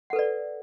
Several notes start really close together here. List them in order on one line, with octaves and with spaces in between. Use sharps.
F#5 A4 B4 D5